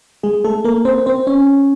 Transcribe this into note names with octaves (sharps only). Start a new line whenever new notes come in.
G#3 G#4
A3 A4
A#3 A#4
C4 C5
C4 C5
C#4 C#5